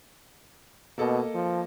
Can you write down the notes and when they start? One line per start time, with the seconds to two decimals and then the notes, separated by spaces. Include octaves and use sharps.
0.98 B2 A#3 A4 D#5
1.34 F3